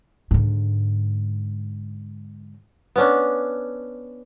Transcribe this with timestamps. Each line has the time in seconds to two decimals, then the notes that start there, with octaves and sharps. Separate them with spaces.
0.31 G#2 D3
2.96 B3 C#4 D4